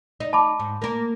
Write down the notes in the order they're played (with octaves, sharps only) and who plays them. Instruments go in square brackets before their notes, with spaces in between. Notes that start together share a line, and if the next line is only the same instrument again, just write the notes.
[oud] D#4
[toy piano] A5 B5 D6
[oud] G#2
A#3 A#4